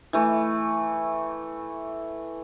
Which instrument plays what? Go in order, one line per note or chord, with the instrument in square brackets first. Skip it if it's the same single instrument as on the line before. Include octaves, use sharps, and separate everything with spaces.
[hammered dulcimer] E3 A3